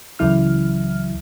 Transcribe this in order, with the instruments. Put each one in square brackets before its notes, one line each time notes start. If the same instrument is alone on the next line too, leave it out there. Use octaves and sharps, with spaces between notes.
[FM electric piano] C#2 C#3 E3 F#3 E4 F6